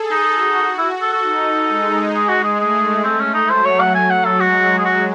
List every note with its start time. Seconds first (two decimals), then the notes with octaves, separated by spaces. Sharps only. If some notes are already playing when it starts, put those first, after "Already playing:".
Already playing: G#4 A4
0.11 D#4
0.33 F#4
0.78 E4
1.02 A4
1.13 A4
1.23 D#4
1.68 G#3
2.15 G#4
2.29 F#4
2.44 G#4
2.59 A3 G#4
3.04 C4
3.20 C#4
3.34 D#4
3.50 F#3 C5
3.65 C#5
3.80 F#5
3.95 G#5
4.10 F#5
4.25 A4
4.40 G#3 F#4
4.78 G#4
4.85 F#4